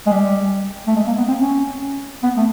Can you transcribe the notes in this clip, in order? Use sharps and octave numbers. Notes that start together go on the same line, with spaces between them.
G#3
G3
A3
G#3
A#3
B3
C4
C#4
B3
A3